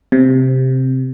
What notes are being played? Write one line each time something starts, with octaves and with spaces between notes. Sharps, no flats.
C3